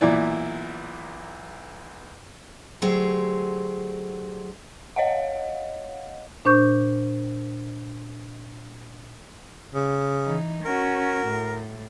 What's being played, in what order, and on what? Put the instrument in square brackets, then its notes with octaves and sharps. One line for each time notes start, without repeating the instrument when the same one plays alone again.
[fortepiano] B1 A#2 E3 E4 D5
[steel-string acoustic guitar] D3 F#3 A3 G4 G#4 C5
[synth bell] C#5 D#5 F5 F#5
[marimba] A#2 D4 C5 C#6 G6
[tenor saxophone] C#3
[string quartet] E3 D#4
[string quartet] C#4 F#4 [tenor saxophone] A#4
[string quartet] A2